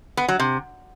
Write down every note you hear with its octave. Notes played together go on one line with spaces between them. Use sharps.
B3
F#3
C3